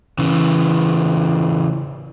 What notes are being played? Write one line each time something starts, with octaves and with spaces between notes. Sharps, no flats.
C#3 E3